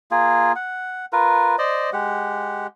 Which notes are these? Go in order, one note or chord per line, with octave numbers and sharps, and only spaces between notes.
A#3 F4 G#4
F#5
F4 A#4 B4
C5 D5 D#5
G#3 G4 F#5